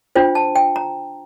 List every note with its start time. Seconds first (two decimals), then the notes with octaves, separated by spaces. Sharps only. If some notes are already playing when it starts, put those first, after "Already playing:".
0.16 D4 F4 C5 G5
0.35 A5
0.55 G5
0.76 A#5